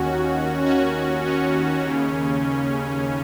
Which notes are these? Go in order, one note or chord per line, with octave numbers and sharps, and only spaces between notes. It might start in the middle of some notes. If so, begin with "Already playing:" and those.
Already playing: D#2 D#3 C#4 F#4
C#4 F#4
C#4
D#2 C#3